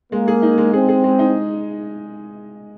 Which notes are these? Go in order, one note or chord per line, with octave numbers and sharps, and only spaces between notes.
G#3 A#3
G#4
D#4
G#3
C4 G#4
G#4
G#3
D#4